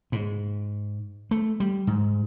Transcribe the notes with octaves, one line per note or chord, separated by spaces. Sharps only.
G#2
A3
G3
G#2